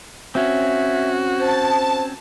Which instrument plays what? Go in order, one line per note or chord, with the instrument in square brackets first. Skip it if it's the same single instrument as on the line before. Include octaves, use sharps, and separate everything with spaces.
[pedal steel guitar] C4 C#4 [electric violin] F#4 [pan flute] E5
[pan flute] C5 [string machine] A5